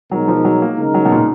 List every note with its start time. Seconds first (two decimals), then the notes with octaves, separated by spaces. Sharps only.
0.11 B2 F#3 G#3 D#4 A#4
0.28 F3
0.45 F#3
0.62 A#3
0.78 C#3 G#3 D#4 A#4
0.94 F#3
1.05 B2
1.12 A#2